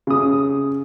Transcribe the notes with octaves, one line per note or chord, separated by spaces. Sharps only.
C#3 D#6